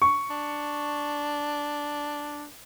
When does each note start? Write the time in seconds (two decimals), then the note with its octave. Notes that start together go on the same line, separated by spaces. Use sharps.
0.02 C#6
0.30 D4